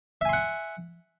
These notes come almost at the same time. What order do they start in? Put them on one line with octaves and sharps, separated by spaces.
E5 G#5 C6 F#5